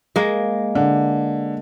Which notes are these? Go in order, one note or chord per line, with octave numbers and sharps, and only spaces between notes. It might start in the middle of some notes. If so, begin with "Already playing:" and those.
G#3 A#3
D3